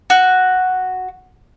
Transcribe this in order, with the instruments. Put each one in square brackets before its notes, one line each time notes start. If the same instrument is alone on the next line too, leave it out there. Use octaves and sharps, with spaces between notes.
[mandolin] F#4